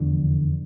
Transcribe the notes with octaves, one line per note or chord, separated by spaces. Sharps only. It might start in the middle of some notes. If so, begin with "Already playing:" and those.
Already playing: F1 E2 D3 F3